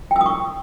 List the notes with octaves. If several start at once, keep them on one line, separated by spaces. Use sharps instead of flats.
G5 C#6 D#6 E6